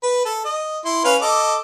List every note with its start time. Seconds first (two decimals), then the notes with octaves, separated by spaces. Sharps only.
0.03 B4
0.25 A4
0.45 D#5
0.85 E4 C6
1.05 C#4 B4 F5
1.22 A4 D#5 D6